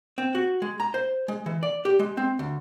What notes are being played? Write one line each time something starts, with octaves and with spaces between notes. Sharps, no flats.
C4
F#4
G#3
A#5
C5
G#3
E3
D5
G4
G#3
C4
D2